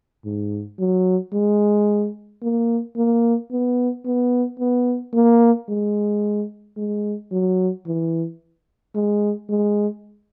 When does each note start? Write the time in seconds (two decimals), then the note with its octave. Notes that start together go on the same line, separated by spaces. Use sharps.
0.25 G#2
0.79 F#3
1.33 G#3
2.42 A#3
2.97 A#3
3.51 B3
4.06 B3
4.59 B3
5.14 A#3
5.69 G#3
6.77 G#3
7.32 F#3
7.86 E3
8.95 G#3
9.49 G#3